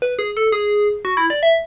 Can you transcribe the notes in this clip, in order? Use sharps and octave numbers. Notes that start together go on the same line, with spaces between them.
B4
G#4
A4
G#4
F#4
E4
D5
E5